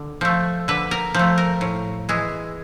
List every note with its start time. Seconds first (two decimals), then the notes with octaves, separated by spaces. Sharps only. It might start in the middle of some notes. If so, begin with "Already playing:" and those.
Already playing: D3
0.21 F3 A3
0.68 D3 B4
0.91 A#4
1.14 F3 A3
1.38 A#4
1.61 A2
2.09 E3 G#3